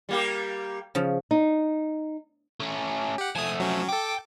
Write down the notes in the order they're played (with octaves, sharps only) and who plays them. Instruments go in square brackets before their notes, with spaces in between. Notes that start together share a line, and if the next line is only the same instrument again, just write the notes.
[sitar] G3 A#3 G4
[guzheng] C#3 F3
[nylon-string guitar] D#4
[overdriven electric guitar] A3 C#4
[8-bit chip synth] G4 F#5
[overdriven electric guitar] F3 A3 [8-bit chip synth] G#5 D#6
[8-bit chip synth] F#3 C#4
[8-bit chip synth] A4 D6 [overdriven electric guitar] G5